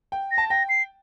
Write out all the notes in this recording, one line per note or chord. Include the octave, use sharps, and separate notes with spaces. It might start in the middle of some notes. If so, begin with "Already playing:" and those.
G5
A#6
A5
G5 A#6
C7